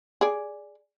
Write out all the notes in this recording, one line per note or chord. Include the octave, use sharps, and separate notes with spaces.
G#4 D5